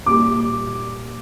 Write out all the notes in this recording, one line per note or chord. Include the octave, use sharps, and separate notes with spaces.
A#2 G3 D6